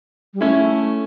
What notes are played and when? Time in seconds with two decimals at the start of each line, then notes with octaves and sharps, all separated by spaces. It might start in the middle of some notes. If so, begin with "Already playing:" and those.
0.34 G3
0.41 A3 C#4 E4